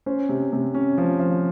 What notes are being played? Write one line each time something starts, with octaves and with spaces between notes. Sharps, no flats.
C#4 C5
C3
C3
C#4
F3
F3